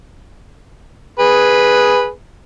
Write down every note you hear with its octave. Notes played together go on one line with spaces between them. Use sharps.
G#4 B4